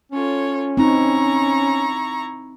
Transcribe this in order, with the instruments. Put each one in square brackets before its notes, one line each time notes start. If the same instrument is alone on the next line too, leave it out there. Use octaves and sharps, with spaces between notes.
[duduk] C#4 [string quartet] F4 A4 C#5
[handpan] C4 D#4 [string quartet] E4 A#5 C#6